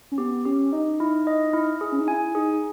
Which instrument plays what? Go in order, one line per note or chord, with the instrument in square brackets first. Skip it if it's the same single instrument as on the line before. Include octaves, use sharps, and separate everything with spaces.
[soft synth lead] C#4
[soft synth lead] B3 [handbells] G4
[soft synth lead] C#4 [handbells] G4
[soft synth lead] D#4 [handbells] D#5
[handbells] E4
D#5
E4
G#4
[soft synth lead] C#4
D#4
[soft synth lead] E4 [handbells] G#5
[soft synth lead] D#4 [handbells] G#4